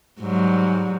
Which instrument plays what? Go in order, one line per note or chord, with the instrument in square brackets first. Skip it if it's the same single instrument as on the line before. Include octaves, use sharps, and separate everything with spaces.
[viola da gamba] G#2 F#3 G3